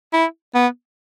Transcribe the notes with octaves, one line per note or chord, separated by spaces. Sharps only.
E4
B3